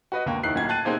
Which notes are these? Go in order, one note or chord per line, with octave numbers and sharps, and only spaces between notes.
F#4 B4 D#5
C#2 D3 A#3 G5 C#6
D#2 D#3 D#4 E4 F#6 C7
D1 A#2 F#5 G#6
G5 A5 F#6 A6 D#7
C3 A#3 C4 D#4 G#4